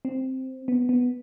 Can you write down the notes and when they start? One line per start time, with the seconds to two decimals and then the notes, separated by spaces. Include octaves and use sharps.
0.05 C4
0.68 B3
0.89 B3